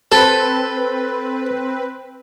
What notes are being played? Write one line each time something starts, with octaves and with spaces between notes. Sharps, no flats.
C4 A4 B4